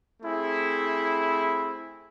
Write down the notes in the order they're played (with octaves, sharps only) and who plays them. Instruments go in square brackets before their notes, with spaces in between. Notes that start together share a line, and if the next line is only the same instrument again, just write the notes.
[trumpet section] A3 C4 E4 G#4